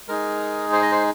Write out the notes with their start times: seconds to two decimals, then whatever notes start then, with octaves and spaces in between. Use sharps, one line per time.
0.08 G#3 D#4 G#4 A#4
0.72 C5
0.82 D#5
0.92 C5